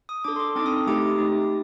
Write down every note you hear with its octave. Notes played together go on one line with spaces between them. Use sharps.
D#6
D4 A4 D6
C6
D6
C4 D#4 A4 D6
D#6
A3 D#4 G4 D6
A3 D#4 G4